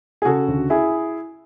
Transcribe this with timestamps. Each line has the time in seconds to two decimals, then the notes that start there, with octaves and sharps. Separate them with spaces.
0.22 G#4
0.25 C#3 F#4 A4
0.48 D2
0.70 E4 G#4